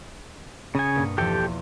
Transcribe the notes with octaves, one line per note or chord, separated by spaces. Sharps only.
C#3 G#5 D#6 G#6 C#7
G2 B2 A#3
E2 B2 F3 G4 A4 G5